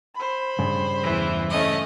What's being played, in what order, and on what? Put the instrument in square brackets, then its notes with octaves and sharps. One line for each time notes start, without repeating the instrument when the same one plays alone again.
[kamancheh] C5 B5
[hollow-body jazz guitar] G2 C#3
[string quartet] E2 E3
A3 C#4 D#5